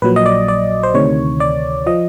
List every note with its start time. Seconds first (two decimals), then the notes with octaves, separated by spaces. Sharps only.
0.02 A#1 A#2 F#3 B4
0.16 D#5
0.26 D5
0.48 D5
0.83 C5
0.94 D2 C3 D#3 C#5
1.40 D5
1.86 F3 D#5